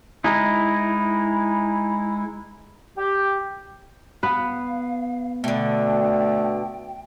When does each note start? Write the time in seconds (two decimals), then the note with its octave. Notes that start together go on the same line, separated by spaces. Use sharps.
0.24 G#3 D#4 E4
2.98 G4
4.23 B3 B4 F5
5.44 B2 D3 A3 G5